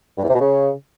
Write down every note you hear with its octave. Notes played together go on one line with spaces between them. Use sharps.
G2
E2
C3
B2
C#3